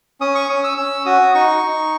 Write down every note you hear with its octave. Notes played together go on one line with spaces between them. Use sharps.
C#4 D#6
C#6
C#4 D#6
E6
C#4 E6
F#4 D#6
D#4 C#6
D#4